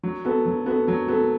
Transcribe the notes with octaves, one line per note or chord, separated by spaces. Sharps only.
F#3
B3 F#4 A4
F#3
B3 F#4 A4
F#3
B3 F#4 A4